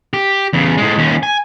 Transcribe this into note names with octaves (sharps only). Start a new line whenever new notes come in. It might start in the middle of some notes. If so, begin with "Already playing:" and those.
G4
E2 C#3
A2 G#3
D#2 C#4
G#5